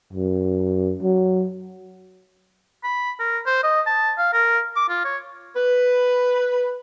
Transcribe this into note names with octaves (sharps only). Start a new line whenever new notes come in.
F#2
F#3
B5
A#4
C5
D#5
A5
F5
A#4
D6
F4
C#5
B4